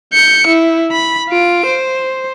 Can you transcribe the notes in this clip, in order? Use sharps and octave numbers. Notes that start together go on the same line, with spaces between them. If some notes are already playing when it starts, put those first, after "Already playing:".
G6 C#7
E4
B5
F4 D7
C5